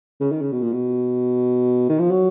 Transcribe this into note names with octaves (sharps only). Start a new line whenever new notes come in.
C#3
D#3
C#3
B2
A#2
B2
D#3
F3
F#3